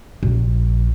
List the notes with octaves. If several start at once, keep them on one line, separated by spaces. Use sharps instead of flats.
A#1